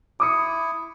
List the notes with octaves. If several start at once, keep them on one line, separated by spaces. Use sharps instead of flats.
E4 D6 D#6 C#7